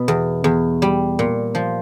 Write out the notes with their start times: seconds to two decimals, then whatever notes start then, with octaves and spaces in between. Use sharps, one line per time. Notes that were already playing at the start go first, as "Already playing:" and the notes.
Already playing: B2
0.08 E2
0.44 E2
0.82 G3
1.19 A#2
1.55 F3